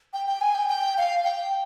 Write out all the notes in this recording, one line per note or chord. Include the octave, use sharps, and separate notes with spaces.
G5
G5
G#5
G5
G5
F5
G5